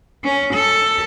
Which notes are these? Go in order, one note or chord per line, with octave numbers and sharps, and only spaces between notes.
C#4
A4